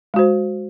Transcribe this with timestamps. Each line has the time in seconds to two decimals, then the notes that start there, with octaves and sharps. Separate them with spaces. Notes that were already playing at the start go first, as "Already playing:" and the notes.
0.14 G#3
0.16 F#4
0.19 C5